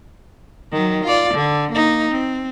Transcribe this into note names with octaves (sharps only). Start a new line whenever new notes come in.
D#3 F#3
F4 D5
D3
A#3 D#4
C4